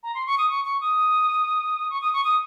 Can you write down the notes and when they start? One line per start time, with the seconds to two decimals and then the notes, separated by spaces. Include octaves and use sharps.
0.03 A#5
0.14 C6
0.26 C#6
0.38 D#6
0.49 C#6
0.65 C#6
0.81 D#6
1.90 C#6
2.01 D#6
2.13 C#6
2.24 D#6